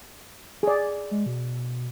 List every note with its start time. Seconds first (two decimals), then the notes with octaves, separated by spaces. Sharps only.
0.63 G#4 D5
1.11 G#3
1.26 B2